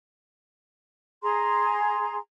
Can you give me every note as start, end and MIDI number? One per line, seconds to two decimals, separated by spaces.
1.22 2.17 68
1.22 2.17 80
1.22 2.17 82
1.22 2.17 84